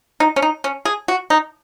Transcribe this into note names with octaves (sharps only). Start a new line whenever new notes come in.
D#4
C#4
D#4
C#4
G#4
F#4
D#4